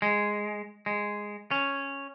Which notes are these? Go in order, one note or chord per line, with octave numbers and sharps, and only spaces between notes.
G#3
G#3
C#4